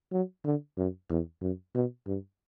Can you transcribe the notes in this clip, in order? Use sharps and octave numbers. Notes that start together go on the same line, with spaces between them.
F#3
D3
F#2
E2
F#2
B2
G2